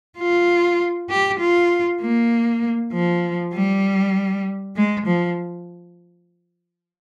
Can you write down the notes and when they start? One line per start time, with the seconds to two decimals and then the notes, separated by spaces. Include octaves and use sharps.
0.18 F4
1.10 G4
1.40 F4
2.01 A#3
2.93 F3
3.53 G3
4.76 G#3
5.06 F3